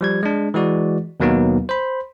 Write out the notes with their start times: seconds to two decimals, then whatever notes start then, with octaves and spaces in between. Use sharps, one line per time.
0.01 F3 G3 G#6
0.23 G#3 D4
0.54 E3 G#3 F#4 D5
1.20 D#2 B2 F#3 A#3 B3 D#4
1.69 C5 B5